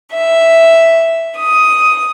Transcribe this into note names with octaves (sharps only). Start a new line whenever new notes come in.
E5
D#6